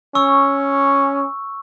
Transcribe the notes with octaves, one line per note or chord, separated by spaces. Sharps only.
C#4 C#6 E6